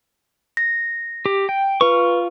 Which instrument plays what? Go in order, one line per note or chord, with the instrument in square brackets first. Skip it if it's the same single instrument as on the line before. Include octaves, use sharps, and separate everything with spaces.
[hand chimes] A#6
[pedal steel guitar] G4
G5
[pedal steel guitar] F4 C#6 [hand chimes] B4